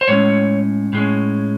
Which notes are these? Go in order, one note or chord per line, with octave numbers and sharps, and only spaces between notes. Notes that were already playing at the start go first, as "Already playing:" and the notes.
C5
A2 G#3 C#4 C#5
A2 G#3 C#4